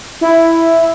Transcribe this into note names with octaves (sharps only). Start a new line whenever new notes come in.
E4